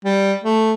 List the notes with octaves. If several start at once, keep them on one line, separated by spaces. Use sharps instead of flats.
G3
A3